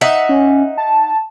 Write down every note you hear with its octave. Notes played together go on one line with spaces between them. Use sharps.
D#4 E5 F#5
C#4
A5